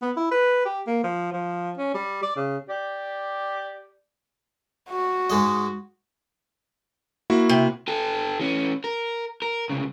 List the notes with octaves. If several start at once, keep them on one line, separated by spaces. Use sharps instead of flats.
B3
E4
B4
G4
A#3
F3
F3
C#4
G3
D5
C#3
G4 D5
F#4
G#2 G#3 D#5
A#3 E4 F#4
C3
G4 A4
E3 C#4
A#4
A#4
C2 C#3